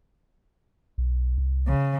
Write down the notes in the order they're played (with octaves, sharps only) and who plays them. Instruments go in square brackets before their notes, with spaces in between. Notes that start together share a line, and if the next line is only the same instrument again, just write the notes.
[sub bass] B1
C2
[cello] C#3